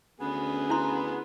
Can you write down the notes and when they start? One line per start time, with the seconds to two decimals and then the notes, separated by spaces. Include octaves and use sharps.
0.20 D2 B3 C#4 G#4 B4
0.70 E4 C6